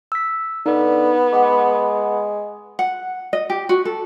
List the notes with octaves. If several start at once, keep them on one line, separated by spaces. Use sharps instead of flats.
E6 B6
D3 B3 D#4
G#3 F#5 B5 D6
F#5
D#5
G4
F#4
A4